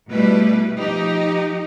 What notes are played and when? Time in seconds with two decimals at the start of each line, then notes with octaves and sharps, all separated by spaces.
0.11 B2 G3 A3 E4 B4
0.77 F3 D#4 G4